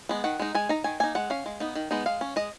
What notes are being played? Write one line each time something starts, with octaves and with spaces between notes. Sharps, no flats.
G#3 B3
D#3 F#5
G#3 D#4
G#3 G#5
D#4 A#5
D#3 G#5
A#3 D#4 G#5
G#3 F#5
C#4 F5
G#3
B3 D#4
D#3
G#3 B3 D#4
G#3 F5
C#4
G#3 D#5